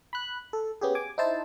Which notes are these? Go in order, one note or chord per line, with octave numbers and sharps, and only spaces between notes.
B5 F#6
A4
B3 C#4 G4 G#4
G#5 D6
D#4 E4 C5 A5